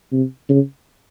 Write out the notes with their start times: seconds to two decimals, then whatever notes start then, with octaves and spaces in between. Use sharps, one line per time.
0.12 C3
0.49 C#3